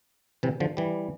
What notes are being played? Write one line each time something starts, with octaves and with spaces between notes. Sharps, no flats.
C3 E3
D3 F3
E3 G3